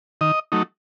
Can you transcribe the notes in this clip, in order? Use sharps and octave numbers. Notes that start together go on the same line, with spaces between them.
D#3 D#5
F#3 A3 D#4